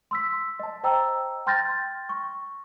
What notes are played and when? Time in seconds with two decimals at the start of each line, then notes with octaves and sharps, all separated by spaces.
0.11 C6 E6 B6
0.60 D#5 A5
0.84 C5 D#5 G5 A#5 E6
1.47 G5 C6 F6 G6 A6 A#6
2.09 C#6